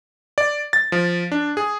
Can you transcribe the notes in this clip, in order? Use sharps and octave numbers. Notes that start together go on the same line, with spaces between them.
D5
A6
F3
D4
G#4